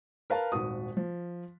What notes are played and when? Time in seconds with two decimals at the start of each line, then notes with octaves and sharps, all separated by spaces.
0.30 A#4 B4 F5 A5
0.52 D#1 G#1 F#4 D#6
0.97 F3